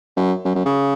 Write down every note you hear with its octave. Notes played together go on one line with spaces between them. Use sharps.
F#2
F#2
F#2
C#3